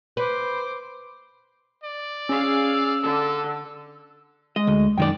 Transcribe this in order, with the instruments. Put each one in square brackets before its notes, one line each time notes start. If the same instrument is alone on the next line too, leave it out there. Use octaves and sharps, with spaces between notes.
[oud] B4 [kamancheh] C5 D6
[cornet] D5
[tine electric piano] C#4 [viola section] G#4 F5 [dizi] E6
[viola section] D3 [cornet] A4
[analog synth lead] G#3 [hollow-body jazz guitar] D#5
[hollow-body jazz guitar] D2
[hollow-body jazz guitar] F#2 D#3 D5 [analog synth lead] G5